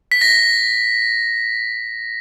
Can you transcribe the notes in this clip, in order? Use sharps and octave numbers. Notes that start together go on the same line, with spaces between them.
B6
A#6